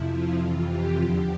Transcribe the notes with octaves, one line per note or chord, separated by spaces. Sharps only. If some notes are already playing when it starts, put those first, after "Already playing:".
Already playing: F2 C3 F3 E4
F4
F2 C3 E3
G4
E2 D3 F3 G4